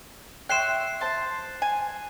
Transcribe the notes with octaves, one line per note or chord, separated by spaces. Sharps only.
C#5 E5 G5 C6 F#6 C7 E7
C5 A5 C6
G#5